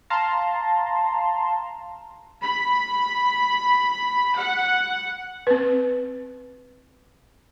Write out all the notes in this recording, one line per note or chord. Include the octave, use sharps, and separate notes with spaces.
F5 A5 A#5 C6
B5
F#5
C4 B4